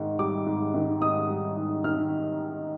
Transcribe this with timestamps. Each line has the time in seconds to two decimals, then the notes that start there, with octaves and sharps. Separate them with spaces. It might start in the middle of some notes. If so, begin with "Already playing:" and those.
Already playing: G#2 D#3
0.19 G3 D6
0.46 G#2
0.74 D#3
1.02 G#2 D#6
1.29 G3
1.57 G#2
1.84 D#3 F6